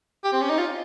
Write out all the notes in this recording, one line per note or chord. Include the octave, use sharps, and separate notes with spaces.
G4
C4
C#4
D#4
F4